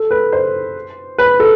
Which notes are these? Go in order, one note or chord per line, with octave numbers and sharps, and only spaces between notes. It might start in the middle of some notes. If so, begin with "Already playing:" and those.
Already playing: A4
B4
C5
B4
A4